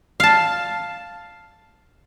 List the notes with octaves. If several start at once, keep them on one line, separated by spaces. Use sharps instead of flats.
F5 A5